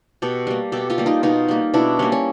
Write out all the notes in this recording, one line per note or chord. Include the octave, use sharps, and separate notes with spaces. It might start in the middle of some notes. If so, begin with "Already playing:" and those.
B2 G4 A4
G3 A#3
B2 G4 A4
F4 G4
G3 A#3
D#4 F4
B2 D#4 F4
G3 A#3
B2 D4 E4
G3 A#3 C#4
C#4